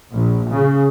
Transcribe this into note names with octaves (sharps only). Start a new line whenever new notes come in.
A#1
C#3